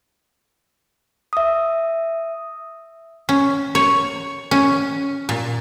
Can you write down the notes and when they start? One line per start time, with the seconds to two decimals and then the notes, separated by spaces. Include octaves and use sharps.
1.33 E5 D#6
3.29 C#4
3.75 C#5
4.51 C#4
5.29 A#2